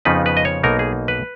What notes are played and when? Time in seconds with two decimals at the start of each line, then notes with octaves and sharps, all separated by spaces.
0.05 F2 C#3 F3 B3 D#4 B4
0.26 B4
0.37 D#5
0.45 C#5
0.63 B1 B2 A#3 D#4 A#4
0.79 G#4
1.08 B4